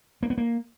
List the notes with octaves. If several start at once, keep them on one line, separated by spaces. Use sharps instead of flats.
A#3
B3
A#3